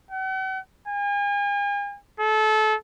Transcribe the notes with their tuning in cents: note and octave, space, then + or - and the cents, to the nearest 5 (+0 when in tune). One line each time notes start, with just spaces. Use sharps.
F#5 +45
G#5 -40
A4 -25